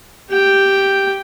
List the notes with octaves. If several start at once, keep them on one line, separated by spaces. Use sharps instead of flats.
G4 G5